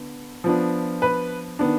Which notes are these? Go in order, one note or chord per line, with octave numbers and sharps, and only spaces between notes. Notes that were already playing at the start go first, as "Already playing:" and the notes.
Already playing: D3 B3
F3 B3 D4
B4
D#3 B3 D4